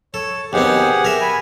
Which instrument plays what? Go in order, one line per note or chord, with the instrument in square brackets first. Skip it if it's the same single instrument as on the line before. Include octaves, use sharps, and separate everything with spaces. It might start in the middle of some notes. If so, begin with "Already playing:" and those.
[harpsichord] A4 [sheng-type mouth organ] C#5
[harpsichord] D#2 B2 C4 [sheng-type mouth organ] G4 G#4 F#5
[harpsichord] A#4 E5
[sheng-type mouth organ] G#5 B5